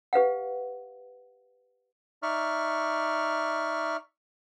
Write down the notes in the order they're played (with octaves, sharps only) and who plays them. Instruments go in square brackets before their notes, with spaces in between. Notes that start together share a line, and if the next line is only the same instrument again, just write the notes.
[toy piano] G4 B4 F5 F#5
[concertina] D#4 D5 E5 C#6 F6